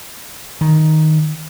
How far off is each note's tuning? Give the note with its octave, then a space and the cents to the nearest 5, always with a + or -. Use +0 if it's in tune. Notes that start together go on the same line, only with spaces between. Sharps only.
D#3 +5